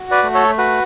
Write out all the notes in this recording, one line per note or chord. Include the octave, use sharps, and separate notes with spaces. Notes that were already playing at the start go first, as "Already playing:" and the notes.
Already playing: F#4
B4 D5
A3
A4 C#5
F#4 B4